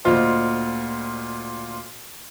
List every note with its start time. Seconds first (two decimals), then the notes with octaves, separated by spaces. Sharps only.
0.05 D2 A#2 F4 C5 D#5 F6